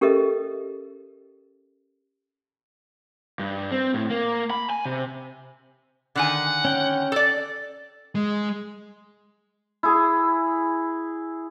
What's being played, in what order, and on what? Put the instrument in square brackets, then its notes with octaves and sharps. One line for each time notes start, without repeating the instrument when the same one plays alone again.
[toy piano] C#4 G4 A4 A#4 D#5 E5
[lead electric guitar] G2
C4
A2
A#3
B5
G#5
C3
[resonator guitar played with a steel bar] D3 D#3 G#5 [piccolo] F#5
[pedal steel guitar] C#4 G5
[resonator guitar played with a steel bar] A4 D5
[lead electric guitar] G#3
[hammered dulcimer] E4 G#4